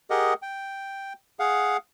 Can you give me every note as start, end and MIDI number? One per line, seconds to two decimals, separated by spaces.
0.10 0.34 67
0.10 0.34 68
0.10 0.34 70
0.10 0.34 75
0.10 0.34 78
0.42 1.13 79
1.39 1.77 68
1.39 1.77 77
1.39 1.77 78